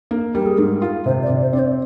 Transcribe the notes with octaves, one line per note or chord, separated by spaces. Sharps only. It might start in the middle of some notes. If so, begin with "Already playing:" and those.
A#3
G3 A#4
G#4
G#2 A#4
F4
C3 C5
D5
C3
C5
C4 D5
C5